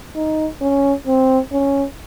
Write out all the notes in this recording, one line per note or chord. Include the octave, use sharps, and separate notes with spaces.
D#4
C#4
C4
C#4